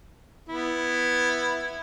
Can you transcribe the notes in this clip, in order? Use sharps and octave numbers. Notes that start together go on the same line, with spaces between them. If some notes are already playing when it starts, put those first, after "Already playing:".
B3 E4